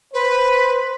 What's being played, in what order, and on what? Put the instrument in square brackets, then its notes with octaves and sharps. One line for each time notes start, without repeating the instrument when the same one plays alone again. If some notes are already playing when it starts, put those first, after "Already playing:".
[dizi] B4 [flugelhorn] C5